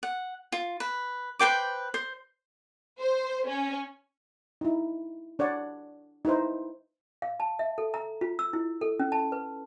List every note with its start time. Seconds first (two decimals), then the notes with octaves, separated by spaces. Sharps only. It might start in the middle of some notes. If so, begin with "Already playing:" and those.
0.03 F#5
0.52 F4
0.80 B4
1.39 B4 C5 G5 D6
1.94 C5
2.99 C5
3.46 C#4
4.61 D#4 E4
5.39 D4 C#5 D5 F#5
6.25 D#4 E4 B4 C5
7.22 F5
7.40 A5
7.59 E5
7.78 A4
7.94 A#5
8.21 F4
8.39 E6
8.53 E4
8.81 A4
8.99 C#4
9.12 A5
9.32 B4